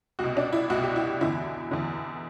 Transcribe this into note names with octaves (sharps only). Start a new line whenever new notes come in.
C2 B2 F#4
D4
E4
C2 B2 F#4
G4
E4
E2 D3 E4
E2 D3